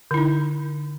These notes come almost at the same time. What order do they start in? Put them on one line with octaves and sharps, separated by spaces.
D3 E4 D#4